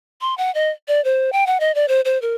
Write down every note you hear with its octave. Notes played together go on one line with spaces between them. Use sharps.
C6
F#5
D#5
D5
C5
G5
F#5
D#5
D5
C5
C5
A#4